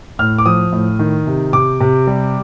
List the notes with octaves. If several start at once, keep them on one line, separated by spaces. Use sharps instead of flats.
A2 F6
D6
F3 D#6
A2
D#3
C3
C3 D6
C3
G3